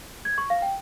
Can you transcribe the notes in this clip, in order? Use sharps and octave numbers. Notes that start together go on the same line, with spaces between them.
G#6
C#6
F5
G5